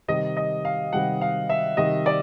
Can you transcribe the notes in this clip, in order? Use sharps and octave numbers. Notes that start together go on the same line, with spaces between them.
C3 D#3 G3 D#5
D#5
F5
C3 D#3 G3 F#5
F5
E5
C3 D#3 G3 D#5
D5